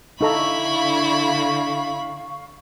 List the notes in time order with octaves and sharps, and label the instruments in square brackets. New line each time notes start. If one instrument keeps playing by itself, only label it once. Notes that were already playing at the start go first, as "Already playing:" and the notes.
[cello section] D3 [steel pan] D#4 A4 A#5 [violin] E4 B5 [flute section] F5 C#6